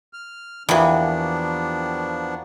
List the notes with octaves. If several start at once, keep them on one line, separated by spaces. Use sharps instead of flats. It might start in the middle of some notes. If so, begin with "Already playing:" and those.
F6
E2 E3 F3 A#3 B3 D4 F#4 G4